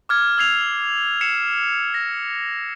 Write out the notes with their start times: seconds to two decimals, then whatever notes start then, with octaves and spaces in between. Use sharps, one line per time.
0.09 D6 F6 G#6
0.38 E6 G#6 C7 F7
1.21 C7 C#7 E7
1.94 A#6